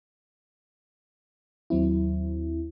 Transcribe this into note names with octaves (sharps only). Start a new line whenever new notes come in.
D#2 F#3 C4 E4